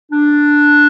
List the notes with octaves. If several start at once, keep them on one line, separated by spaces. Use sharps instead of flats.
D4